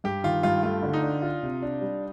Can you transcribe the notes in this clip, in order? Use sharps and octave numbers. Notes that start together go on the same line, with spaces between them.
G2 G4
D#3 F4
G2 F4
A3 F4
D3
D#4
D4
F4
C3
D4
G3